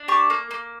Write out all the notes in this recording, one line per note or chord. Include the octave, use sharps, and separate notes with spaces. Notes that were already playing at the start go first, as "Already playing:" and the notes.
Already playing: D4
G4 A5 C#6
A#3
A#3